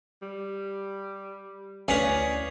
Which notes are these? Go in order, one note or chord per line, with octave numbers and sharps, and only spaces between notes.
G3
D2 C#4 E4 G#4 B4 D5 F5